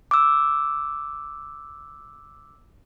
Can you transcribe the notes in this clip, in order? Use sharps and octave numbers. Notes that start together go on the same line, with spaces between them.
D6 E6